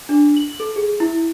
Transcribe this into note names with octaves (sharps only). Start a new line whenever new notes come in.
D4
F#7
A4
G#4
E4